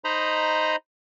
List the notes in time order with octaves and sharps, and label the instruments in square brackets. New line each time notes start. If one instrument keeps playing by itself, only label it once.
[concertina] D#4 C5 D#5 A#5 B5